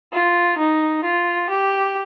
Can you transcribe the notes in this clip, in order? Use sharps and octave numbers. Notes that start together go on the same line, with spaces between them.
F4
D#4
F4
G4